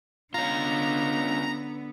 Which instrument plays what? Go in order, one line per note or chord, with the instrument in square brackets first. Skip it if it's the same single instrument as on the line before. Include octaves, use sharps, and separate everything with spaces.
[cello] D3 B3 [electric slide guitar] C#4 F4 [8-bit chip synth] A#5